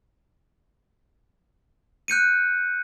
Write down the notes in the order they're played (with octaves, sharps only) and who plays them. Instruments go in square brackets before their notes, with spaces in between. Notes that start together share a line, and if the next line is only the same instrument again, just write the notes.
[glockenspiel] F#6 G6 C#7 D#7